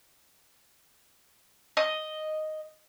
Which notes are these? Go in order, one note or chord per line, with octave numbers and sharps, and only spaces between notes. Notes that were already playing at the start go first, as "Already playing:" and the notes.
D#5